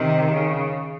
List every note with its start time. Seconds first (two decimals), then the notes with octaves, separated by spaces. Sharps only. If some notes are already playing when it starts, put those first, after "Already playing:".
Already playing: C3 D#3
0.32 C#3